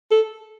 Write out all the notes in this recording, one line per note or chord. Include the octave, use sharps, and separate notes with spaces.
A4